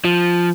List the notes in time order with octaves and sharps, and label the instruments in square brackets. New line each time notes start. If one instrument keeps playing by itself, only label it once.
[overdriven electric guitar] F3